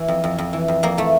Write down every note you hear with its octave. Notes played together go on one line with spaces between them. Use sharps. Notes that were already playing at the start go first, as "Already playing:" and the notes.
Already playing: E3
F2
F2
F2
E3
F2
F2 A#3
E3 A3